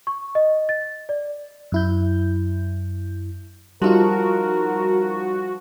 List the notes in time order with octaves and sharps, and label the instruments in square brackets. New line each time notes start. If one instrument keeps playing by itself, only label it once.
[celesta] C#6
D#5
A6
D5
[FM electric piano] F#2 E4 G6
[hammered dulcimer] F3 F5 [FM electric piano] G3 D#4 F4 [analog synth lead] F#4 [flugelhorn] A#4